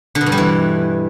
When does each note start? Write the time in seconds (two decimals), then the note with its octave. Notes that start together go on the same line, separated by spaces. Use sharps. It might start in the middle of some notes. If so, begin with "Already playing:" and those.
0.15 D3
0.21 B2
0.26 G2
0.32 G3
0.38 E3